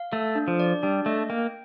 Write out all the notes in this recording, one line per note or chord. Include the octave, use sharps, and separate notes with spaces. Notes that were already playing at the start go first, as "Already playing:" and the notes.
Already playing: F5
A3 A4
D4
F3
D5
G3 D4
A3 D#5
A#3 G5